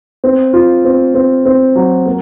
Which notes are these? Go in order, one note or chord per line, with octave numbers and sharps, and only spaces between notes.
C4
F4
C4
C4
C4
F#3
A#3